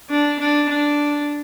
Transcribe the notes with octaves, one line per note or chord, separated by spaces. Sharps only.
D4
D4
D4